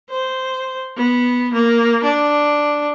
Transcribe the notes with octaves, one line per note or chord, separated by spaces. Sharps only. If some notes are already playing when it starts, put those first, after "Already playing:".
C5
B3
A#3
D4